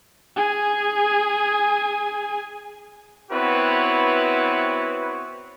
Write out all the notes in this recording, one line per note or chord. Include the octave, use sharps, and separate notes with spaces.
G#4 G#5
B3 C4 E4 F#4 B4 C#5